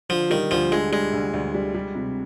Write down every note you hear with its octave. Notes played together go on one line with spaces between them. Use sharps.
D3 F3
D#3 G3
D2 F3
D3 G#3
G3 G#3
D2
D2
G3
G3
C3